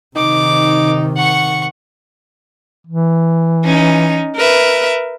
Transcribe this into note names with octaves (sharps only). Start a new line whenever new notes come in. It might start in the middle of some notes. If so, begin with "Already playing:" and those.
C3 D#3 D#4 D6
F#5 C#6
E3
C#4 D#4
A#4 B4 E5